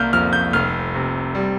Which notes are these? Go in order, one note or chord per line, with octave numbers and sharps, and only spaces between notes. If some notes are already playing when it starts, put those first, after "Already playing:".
Already playing: C2 A#3 F6 G6
F2 F6
G6
F1 F6
C3
G3